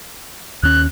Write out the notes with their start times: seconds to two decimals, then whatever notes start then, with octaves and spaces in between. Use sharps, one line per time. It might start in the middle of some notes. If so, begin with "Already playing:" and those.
0.63 D#2 C#4 F#6